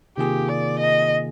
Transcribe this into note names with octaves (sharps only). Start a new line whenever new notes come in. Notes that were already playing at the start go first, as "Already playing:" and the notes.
C3 D#3 A#3 F4 G4 G#4
D5
D#5